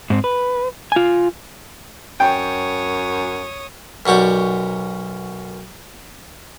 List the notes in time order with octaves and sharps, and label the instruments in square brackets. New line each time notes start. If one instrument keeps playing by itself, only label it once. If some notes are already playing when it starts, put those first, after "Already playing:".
[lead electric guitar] G#2 C4
B4
F4 G#5
[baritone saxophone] F#2 [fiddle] C#5 D#6 [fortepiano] G5
[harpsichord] B1 F#2 F#4 G4 D5